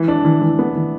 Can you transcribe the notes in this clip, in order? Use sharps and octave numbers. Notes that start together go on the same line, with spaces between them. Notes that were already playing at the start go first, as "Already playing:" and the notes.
Already playing: E3
D4
E3
E3
B3
E3